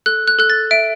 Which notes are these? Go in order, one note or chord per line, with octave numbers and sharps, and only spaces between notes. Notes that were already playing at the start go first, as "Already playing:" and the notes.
A4 F#6
F#6
A4 F#6
A6
E5 D7